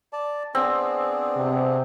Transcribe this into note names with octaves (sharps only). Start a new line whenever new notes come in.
D5 A5
B3 C4 D4 G#4
C3